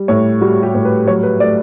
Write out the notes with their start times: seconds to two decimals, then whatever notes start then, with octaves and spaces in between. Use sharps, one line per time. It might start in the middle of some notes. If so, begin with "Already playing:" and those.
Already playing: G3
0.08 A2 C#5
0.41 G3 F#4
0.63 G4
0.74 A2
0.85 B4
1.07 F#3 C#5
1.23 B4
1.40 A3 D5